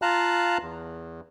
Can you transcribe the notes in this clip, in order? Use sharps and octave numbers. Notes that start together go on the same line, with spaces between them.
F4 F5 A5 A#5 F#6
E2